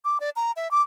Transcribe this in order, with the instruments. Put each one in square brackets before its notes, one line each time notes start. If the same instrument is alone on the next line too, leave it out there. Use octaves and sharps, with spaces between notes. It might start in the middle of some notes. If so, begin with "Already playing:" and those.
[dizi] D6
D5
A#5
E5
D6